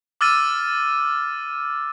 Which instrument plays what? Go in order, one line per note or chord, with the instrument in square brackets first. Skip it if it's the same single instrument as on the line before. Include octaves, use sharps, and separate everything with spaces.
[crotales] D6 E6 F6 A6 D#7